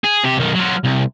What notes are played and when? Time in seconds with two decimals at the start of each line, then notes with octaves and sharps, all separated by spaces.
0.04 G#4
0.24 C3 G4
0.37 B1 D#3
0.55 F#3 F4
0.85 C2